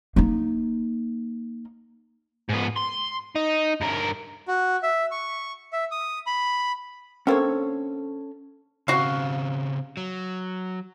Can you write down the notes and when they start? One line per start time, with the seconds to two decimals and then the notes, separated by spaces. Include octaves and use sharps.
0.16 A#3 D#4
2.49 G#2 B3
2.76 C6
3.35 D#4
3.81 G2 A#4
4.48 F#4
4.83 E5
5.11 C#6
5.73 E5
5.91 D#6
6.26 B5
7.27 D3 A#3 C4 C#4 A4 C#5
8.88 C#3 C4 F#4 F5
9.97 F#3